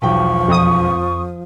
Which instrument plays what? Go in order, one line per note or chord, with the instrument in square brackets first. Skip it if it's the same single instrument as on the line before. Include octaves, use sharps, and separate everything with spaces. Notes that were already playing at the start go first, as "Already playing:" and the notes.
[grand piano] E1 B1 G5 [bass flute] F3 [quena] C#6
[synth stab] F2 D#6